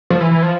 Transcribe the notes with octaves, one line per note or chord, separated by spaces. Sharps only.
F3
E3
E3
F3